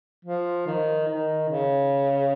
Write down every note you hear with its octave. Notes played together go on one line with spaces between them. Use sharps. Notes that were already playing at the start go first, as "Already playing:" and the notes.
F3
D#3
D#3
C#3